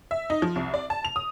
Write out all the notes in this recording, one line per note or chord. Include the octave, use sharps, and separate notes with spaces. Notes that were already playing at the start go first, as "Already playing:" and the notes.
E5
D#4
F3
C2
D5
A5
F7
D#6